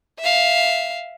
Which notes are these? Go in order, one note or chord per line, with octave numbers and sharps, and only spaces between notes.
E5 F5